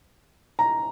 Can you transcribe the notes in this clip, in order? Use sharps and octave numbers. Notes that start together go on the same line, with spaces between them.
A#5